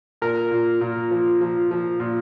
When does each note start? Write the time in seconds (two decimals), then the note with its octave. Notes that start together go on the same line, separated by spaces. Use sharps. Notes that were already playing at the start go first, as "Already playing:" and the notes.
0.22 A#2 A#4
0.51 A#2
0.81 A#2
1.11 F3
1.41 F3
1.71 F3
2.00 A#2